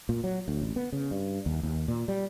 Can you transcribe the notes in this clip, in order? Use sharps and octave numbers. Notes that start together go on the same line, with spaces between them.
A#2
F#3
D2
A1
B3
C#3
G2
D#2
D#2
A#2
G3